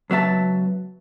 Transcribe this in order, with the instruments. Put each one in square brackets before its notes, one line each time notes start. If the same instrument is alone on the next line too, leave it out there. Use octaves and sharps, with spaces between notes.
[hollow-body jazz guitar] C#2 F#3 B3 E5 A5